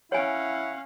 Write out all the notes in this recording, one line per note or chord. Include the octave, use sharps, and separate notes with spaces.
C#4 E4 C#5 F5 F#5 G#5